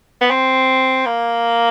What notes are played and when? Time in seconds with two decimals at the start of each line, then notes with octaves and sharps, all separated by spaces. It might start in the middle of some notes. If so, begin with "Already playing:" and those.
0.21 B3
0.31 C4
1.06 A#3